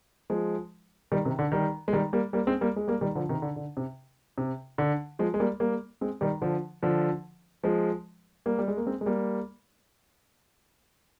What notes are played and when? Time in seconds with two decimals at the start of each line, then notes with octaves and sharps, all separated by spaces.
0.30 F3 G#3
1.12 D#3 G3
1.25 C3 D#3
1.39 D3
1.52 D#3 G3
1.88 G#3
1.93 D#3 G3
2.13 G3 A#3
2.33 G3 A#3
2.47 G#3 C4
2.61 G3 A#3
2.76 G#3
2.88 G3 A#3
3.01 D#3 G3
3.15 D3 F3
3.29 C3 D#3
3.42 D3
3.56 D3
3.77 C3
4.38 C3
4.78 D3
5.19 F3 G#3
5.34 G#3
5.40 G3 A#3
5.60 G3 A#3
6.01 G#3 C4
6.21 D#3 G3
6.41 D3 F3
6.83 D3 F3
7.63 F3 G#3
8.46 G3 A#3
8.59 G3
8.68 G#3
8.77 A#3
8.86 G#3 C4
9.01 G#3
9.06 G3 A#3